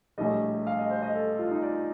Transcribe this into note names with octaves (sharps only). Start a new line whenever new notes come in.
A#1 A2 G3 D#5
F5
D#5
C5
D#5
A4
F4
D#4
D5